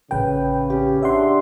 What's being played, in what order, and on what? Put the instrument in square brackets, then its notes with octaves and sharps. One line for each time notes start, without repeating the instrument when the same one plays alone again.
[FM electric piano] A1 G5 [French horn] C#3 [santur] B4
[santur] C#4 G4
[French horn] D4 [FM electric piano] E5 F#5 C6